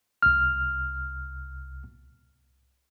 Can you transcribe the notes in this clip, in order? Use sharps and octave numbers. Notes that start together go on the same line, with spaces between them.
C2 F6